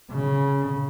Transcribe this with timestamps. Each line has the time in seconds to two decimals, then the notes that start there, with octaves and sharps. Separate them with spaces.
0.11 C#3